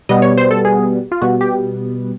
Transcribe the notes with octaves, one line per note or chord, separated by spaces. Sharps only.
B2 G3 B3 D#5
C#5
C5
A4
G#4
F4
B2 G3 B3 F#4
G4